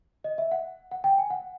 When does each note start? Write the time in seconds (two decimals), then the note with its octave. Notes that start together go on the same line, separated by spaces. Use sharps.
0.24 D#5
0.38 E5
0.51 F#5
0.91 F#5
1.04 G5
1.18 G#5
1.30 F#5